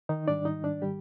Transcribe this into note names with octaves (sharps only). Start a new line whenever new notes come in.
D#3 D#4
G#2 D#3 G3 D4 D5
D#4 D#5
D4 D5
G3 G4